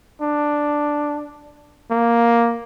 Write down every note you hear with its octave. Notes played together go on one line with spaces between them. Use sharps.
D4
A#3